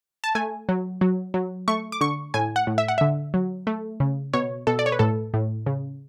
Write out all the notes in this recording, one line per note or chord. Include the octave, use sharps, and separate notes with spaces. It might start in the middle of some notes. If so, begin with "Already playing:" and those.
A5
A3 G#5
F#3
F#3
F#3
A3 C#6
D6
D3 C#6
A2 G#5
F#5
A2
E5
F#5
D3 E5
F#3
A3
C#3
B2 C#5
B2 A4
D5
C#5
B4
A2 A4
A2
C#3